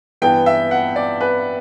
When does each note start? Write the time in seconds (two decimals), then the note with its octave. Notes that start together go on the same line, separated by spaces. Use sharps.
0.22 G2 E3 B3 G5
0.46 E5
0.71 F#5
0.96 D5
1.21 B4